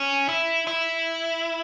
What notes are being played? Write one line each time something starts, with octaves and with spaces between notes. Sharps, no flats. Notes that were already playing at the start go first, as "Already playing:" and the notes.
Already playing: C#4
E4
E4